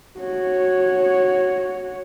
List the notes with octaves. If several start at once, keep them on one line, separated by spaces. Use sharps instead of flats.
F#4 C#5